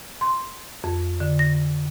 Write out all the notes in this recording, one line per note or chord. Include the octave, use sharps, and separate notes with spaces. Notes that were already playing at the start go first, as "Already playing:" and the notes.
C6
F2
D3
A#6